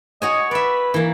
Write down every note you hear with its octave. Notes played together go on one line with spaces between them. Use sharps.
F#4 C#5 D#5 G#5
B4 D5 E5
E3 A#3